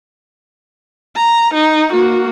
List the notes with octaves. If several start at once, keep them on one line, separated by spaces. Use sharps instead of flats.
A#5
D#4
A#3 F#4